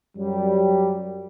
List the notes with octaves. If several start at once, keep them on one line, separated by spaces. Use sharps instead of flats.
F#2 F#3 G3